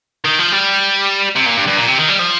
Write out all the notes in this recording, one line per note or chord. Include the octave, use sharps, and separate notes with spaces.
D#3
F3
G3
C3
A#2
G2
G2
A#2
C3
D#3
G3
F3